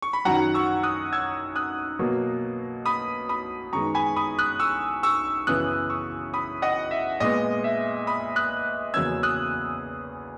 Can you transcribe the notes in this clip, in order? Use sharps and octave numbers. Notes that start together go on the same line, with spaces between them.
C#6
B5
F#2 D#3 F#3 F#5 A#5
C#6 E6
D#6 F#6
E6 G#6
D#6 F#6
B2 F#3 A#3
B5 D#6
B5 D#6
F#2 D#3 G#3 B3 A#5 C#6
G#5 B5
B5 D#6
D#6 F#6
C#6 E6
C#6 E6
F#2 C#3 E3 B3 D#6 F#6
C#6 E6
B5 D#6
D#5 F#5
E5
A#2 G#3 B3 D#5
E5
B5 D#6
D#6 F#6
E2 C#3 F#3 A#3 C#4 E6 G#6
D#6 F#6